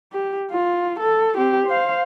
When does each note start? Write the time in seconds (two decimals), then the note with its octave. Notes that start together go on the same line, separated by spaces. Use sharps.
0.12 G4
0.51 F4
1.00 A4
1.36 C4 G4
1.67 C5 F5